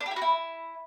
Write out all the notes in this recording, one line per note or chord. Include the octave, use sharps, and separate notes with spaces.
D4
G4
E4
F#4
E4